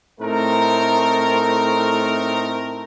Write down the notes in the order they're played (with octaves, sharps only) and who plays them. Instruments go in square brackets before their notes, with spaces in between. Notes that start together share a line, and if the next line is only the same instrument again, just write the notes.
[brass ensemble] A2 A3 C4 D#4 A#4